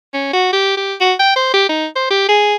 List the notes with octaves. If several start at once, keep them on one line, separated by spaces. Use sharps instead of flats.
C#4
F#4
G4
G4
F#4
G5
C5
G4
D#4
C5
G4
G#4